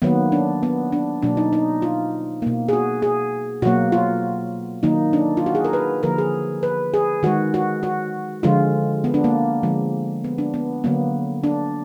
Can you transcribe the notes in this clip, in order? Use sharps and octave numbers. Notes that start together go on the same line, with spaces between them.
D#3 F#3 A#3 B3
D4
B3
D4
B2 F#3 A#3 D4
D#4
D#4
F4
B2 A#3
G#4
F#4
G#4
B2 F#3 A#3 F#4
F4
D#3 F#3 A#3 D#4
D4
F4
F#4
G#4
A#4
B4
D3 F3 A#3 A#4
G#4
B4
G#4
D#3 G#3 F#4
F#4
F#4
D3 F3 G#3 F4
B3
D4
A#3
D3 F3 G#3
B3
D4
B3
D3 F#3 A#3 B3
D4